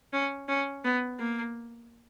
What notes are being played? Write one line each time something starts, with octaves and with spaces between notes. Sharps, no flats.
C#4
C#4
B3
A#3